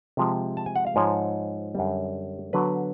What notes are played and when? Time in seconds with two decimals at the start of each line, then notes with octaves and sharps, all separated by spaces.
0.17 C3 F3 G#3
0.57 A5
0.66 G#5
0.76 F#5
0.87 F5
0.96 G#2 F3 G#3 C#5
1.75 F#2 D3 G3
2.53 D3 F#3 B3 B4